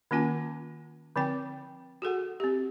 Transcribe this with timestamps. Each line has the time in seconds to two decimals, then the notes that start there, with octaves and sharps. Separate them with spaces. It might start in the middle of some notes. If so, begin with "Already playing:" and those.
0.11 D#3 A#3 C#4 F4 G#5
1.16 D3 F3 C4 G5
2.02 F#4 G#4 A4 F#5
2.40 C4 G4